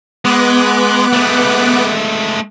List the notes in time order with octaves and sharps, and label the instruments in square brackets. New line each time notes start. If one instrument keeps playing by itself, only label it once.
[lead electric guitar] G#3 [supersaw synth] B3 D6 F#6
[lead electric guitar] G#3 A3